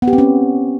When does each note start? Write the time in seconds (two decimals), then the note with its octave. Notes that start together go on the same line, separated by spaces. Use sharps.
0.02 B3
0.08 G4
0.13 C4
0.18 C#4